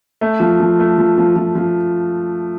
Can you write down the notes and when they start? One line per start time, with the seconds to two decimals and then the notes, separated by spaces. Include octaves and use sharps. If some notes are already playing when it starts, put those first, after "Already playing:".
0.21 A3
0.40 F3
0.60 F3
0.79 A3
0.98 F3
1.18 F3
1.36 F3
1.55 F3